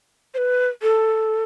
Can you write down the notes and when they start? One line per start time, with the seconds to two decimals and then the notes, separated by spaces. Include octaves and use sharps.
0.34 C5
0.38 B4
0.83 A4